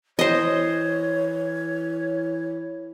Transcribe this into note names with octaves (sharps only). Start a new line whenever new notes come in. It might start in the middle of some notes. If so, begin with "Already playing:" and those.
E3 C5 C#5 D#5